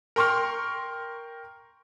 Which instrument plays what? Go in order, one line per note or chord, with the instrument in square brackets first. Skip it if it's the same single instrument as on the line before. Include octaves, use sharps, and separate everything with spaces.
[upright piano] A#4 G5 C6 C#6 F6